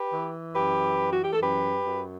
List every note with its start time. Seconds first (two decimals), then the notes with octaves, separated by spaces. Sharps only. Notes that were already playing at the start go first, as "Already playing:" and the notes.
Already playing: G4 B4
0.12 E3
0.54 F#2 G4 B4
0.97 E3
1.12 F#4
1.22 G4
1.31 A4
1.41 F#2 G4 B4
1.85 F#2